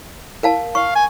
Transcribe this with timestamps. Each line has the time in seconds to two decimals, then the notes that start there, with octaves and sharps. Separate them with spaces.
0.43 A#4 F5 A5
0.75 F5 C#6
0.95 G#5